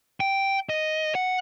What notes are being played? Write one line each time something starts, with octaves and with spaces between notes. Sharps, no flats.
G5
D#5
F#5